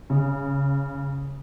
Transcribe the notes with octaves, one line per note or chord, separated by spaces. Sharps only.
C#3